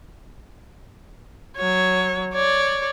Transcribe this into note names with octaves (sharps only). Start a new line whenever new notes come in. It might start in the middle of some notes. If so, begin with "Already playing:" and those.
F#3 C#5
C#5 D5